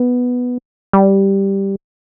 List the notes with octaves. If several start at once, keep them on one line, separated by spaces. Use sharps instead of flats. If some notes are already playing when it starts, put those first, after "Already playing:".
Already playing: B3
G3